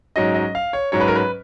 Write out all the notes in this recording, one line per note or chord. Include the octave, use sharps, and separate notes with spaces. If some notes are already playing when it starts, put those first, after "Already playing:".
G#2 F#3 C#4 D#5
D#5
F5
C#5
G#2 F#3 C#4 C#5
B4
A#4
B4